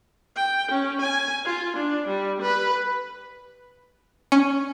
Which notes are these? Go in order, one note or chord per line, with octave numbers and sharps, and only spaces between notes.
G5
C#4
G#5
F4
D4
G3
B4
C#4